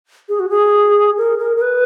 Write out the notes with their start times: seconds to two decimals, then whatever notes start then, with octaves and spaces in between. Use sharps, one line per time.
0.29 G#4
0.40 F#4
0.49 G#4
1.18 A#4
1.39 A#4
1.57 A#4
1.62 B4